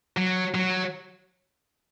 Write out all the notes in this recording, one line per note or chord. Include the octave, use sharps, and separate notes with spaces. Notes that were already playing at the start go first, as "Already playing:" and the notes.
F#3
F#3